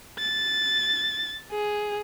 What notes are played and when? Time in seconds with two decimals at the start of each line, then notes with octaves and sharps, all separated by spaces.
0.19 A6
1.51 G#4